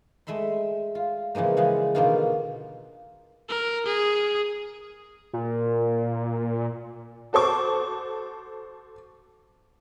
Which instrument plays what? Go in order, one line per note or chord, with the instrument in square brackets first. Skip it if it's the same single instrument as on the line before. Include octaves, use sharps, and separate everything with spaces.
[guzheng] G#3 A3 E5 B5 C6
F4
C#3 E3 F3 G#3 A#3
C#3 E3 F3 G#3 B3
B2 D3 D#3 A#3 B3 F4
[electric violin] A#4
G#4
[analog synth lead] A#2
[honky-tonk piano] F#4 A4 C5 C#6 D6